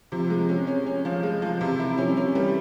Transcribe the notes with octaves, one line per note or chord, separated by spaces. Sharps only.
C3 F3
G#3
C#4
C#4
C#4
F3
G#3
F3
C3 E3
E4
F3 C#4
G3
F3 C#4
E3 G3